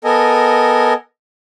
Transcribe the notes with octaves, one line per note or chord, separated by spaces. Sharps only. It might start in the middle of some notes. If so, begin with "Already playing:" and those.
B3 A4 A#4 D#5 G#5